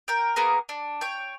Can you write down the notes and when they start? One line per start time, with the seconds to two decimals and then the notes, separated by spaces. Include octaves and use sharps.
0.08 A#4 G5
0.36 A#3 B3 G#4 A#5
0.69 D4
1.01 C#5 G5